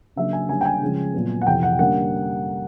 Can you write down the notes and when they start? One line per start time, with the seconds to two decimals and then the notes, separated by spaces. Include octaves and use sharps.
0.16 C#3 F#3 A#3 D4 E5
0.33 G#5
0.49 D3 G3 A#3 C#4 G#5
0.61 G5
0.65 G#5
0.81 C#3 F3 G#3 C#4
1.14 A#2 F#3 B3
1.42 F#5
1.47 F2 C3 E3 G5
1.63 F#5
1.79 D3 G3 A#3 C#4 F#5